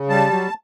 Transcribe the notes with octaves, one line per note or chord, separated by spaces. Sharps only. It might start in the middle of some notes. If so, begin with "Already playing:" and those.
Already playing: C#3
G3 A5
F#3